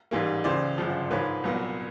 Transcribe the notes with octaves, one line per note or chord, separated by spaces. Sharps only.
A1 G#2 E3 G3 A#3
C#2 C#3 E3 C5 D5
G1 F#2 C#3 F3
G#2 F3 A#3 B4 C#5
C2 A#2 F#3 B3